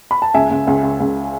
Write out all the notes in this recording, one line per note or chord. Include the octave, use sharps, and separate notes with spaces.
B5
A5
C#2 E5 G#5
C#2
C#2
C#2
C#2